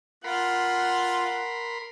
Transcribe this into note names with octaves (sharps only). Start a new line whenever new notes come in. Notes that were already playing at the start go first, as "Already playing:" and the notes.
F4 A#4 F#5 B5 C6